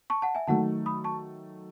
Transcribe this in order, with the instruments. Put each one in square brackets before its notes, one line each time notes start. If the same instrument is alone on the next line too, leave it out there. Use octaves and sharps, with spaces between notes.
[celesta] A5 C#6
F#5 A5
E5 G#5
[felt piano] D#3 F#3 A3 [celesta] F#5 A5
[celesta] B5 D#6
A5 C#6